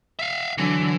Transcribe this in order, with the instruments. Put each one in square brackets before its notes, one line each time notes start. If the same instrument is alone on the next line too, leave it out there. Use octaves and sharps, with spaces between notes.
[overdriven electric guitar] E5 F5
[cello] D3 F#3 [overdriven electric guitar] E3